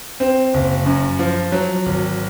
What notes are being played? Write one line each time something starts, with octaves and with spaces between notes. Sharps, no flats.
C4
F#1
F#2
F3
F#3
G#1